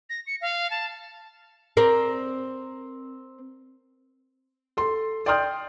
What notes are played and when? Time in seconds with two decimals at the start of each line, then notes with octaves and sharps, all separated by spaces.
0.10 A#6
0.27 C#7
0.41 F5
0.70 A5
1.77 C4 A#4 D5
4.77 A4 C6
5.26 D5 G5 C6 D#6 F6 G6